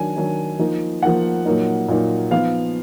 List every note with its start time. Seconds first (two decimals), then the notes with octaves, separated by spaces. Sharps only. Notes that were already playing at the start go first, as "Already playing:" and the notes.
Already playing: D#3 F#3 D4 G#5
0.16 D#3 F#3 D4
0.59 F3 A#3 D#4
1.02 F3 A#3 D#4 F#5
1.46 A#2 F#3 A#3 D#4
1.88 A#2 F#3 A#3 D#4
2.31 F3 B3 D#4 F5